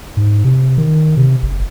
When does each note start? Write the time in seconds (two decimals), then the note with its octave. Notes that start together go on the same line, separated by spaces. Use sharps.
0.17 G#2
0.44 C3
0.78 D#3
1.17 C3
1.43 F#1